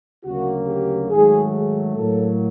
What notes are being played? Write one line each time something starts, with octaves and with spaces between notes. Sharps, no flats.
D2 C#3 F#3 A#3 F#4
G4
G#2 D#3 F#3 A3 G#4
G#4
A2 F#3 A#3 A4